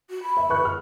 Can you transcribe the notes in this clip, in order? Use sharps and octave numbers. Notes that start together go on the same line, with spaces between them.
F#4
B5
E5
B4 C#6 F#6
F6